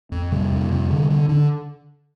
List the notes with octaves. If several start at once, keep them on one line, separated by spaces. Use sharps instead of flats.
F2
C3 G3
F2
C3
D3
D3
D3